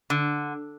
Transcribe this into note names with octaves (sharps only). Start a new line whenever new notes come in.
D3